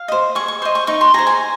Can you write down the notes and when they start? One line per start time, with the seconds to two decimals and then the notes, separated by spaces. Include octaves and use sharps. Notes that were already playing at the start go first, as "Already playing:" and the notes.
Already playing: F5
0.08 C5 D#5
0.35 G#4 C#6
0.48 C#6
0.62 C5 D#5 C6
0.75 C#6
0.87 D#4 C#6
1.01 C6
1.14 G#4 C5 A#5
1.27 G#5